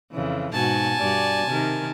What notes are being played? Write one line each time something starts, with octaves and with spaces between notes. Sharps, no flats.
F2 C#3 E3
G#2 B2 F#4 G#5 A5
G2 F#4 D5
C3 D#3 A#4